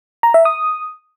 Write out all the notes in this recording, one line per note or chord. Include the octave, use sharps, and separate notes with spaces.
A#5
E5
D#6